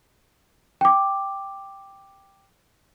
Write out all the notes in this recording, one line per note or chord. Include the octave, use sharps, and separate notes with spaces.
G5 D6